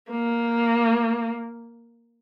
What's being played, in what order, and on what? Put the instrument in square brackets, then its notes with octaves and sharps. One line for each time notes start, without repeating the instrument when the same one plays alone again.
[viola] A#3